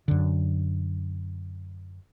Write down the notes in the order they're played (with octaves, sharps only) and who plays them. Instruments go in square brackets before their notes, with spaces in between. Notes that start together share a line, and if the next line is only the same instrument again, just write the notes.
[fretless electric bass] F#2 D3